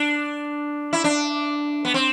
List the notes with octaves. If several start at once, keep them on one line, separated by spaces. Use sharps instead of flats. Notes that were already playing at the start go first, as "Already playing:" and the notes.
Already playing: D4
E4
D4
B3
C4